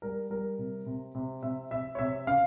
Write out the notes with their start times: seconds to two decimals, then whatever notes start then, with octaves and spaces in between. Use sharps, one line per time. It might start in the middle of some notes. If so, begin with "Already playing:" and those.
0.02 G3 A#4
0.30 G3 A#4
0.58 C3
0.86 C3
1.15 C3
1.43 C3 E5
1.71 C3 E5
1.95 C#5
1.99 C3 E5
2.27 C#3 F5